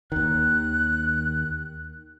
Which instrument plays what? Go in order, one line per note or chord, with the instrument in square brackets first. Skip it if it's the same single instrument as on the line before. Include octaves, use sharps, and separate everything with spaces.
[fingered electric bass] D#2 D#3 [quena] F#6